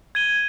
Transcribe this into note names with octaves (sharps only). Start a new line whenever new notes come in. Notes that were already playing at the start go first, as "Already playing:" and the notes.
G#6 D#7 G7